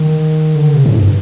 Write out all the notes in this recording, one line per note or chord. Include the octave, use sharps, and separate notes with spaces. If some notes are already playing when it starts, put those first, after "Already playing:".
Already playing: D#3
D3
C3
A2
G2